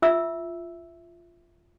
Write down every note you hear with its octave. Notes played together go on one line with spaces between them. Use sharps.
F4 E5 E6